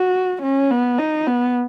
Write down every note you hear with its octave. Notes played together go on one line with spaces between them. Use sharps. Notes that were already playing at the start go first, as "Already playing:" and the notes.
Already playing: F#4
C#4
B3
D#4
B3